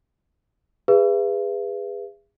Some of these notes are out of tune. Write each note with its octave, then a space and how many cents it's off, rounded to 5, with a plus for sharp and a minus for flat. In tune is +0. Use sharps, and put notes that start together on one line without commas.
G#4 -30 B4 +0 E5 +40